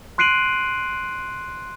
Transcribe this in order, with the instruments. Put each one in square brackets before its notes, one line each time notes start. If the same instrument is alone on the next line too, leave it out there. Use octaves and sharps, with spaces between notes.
[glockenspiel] C6 F#6 C7 D7 D#7 F#7